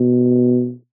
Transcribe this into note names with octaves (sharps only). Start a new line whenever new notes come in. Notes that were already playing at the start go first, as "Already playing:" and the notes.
Already playing: B2